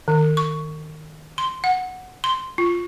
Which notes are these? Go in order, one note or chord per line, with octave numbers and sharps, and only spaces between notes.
D#3
C#6
C6
F#5
C6
F4